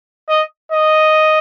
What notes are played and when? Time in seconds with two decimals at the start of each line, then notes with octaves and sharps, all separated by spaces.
0.29 D#5
0.72 D#5